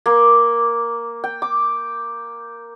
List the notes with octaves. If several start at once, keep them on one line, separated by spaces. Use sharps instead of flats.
A#3
G5
D6